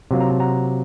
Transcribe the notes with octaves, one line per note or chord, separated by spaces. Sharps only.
C3 F#3 A#3 F4
A#5
A5
F#5 A#5